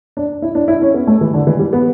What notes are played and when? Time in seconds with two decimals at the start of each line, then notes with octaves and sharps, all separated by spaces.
0.17 D4
0.42 E4
0.55 D4
0.68 E4
0.82 C#4
0.94 B3
1.07 A3
1.21 E3
1.34 D3
1.47 E3
1.59 G3
1.73 B3